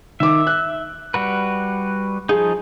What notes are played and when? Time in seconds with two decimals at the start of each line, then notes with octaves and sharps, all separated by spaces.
0.20 D#3 E5 D6
0.47 F#6
1.14 G3 F#4 B4
2.29 F3 D#4 G#4